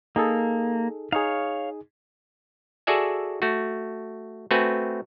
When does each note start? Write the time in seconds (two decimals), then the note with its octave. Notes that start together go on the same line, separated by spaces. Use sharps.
0.16 A#3 D#4 G#4 A4
1.12 D#4 G#4 C#5 F5
2.87 F#4 G#4 A4 D5 E5 G#5
3.42 A3 F#4
4.51 A3 C4 F#4 B4 G#5